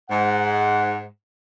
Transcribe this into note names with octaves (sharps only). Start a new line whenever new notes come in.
G#2 F#5